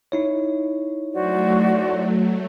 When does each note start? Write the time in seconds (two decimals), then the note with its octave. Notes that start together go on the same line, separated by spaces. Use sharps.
0.12 D#4 E4 C#5
1.13 F#3 A3 F#4 C5 D5